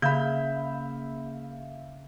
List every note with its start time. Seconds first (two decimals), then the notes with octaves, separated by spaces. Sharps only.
0.02 C#3 A#3 E5 F5 B5 G6